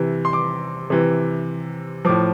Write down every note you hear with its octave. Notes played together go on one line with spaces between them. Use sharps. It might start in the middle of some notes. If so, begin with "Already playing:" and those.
Already playing: C3 E3
C6
D6
C3 E3
A2 F3 D6